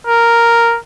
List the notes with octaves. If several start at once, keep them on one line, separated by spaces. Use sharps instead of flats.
A#4